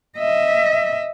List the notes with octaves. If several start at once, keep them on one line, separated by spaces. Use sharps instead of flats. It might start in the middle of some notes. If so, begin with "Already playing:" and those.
D#5 E5